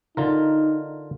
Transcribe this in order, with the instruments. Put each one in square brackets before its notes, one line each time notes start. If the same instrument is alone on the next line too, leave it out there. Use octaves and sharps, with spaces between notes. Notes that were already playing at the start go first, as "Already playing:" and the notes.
[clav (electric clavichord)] D3 F4 A#4 [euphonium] D#4